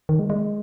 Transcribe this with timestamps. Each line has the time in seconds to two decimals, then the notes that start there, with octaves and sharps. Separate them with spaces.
0.09 D#3
0.19 G#3
0.30 G#3